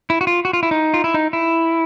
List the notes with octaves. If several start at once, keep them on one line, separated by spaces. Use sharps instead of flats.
E4
F#4
F4
F#4
F4
E4
D#4
F4
E4
D#4
E4